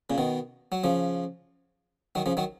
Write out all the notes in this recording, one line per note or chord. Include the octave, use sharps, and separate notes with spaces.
A#2 C#3
B2 D#3
F#3
C#3 F3
D#3 F#3
C#3 F3
D#3 F#3